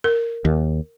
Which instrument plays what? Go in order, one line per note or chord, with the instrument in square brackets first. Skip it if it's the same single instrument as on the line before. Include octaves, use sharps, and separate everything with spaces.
[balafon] A#4
[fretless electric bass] D#2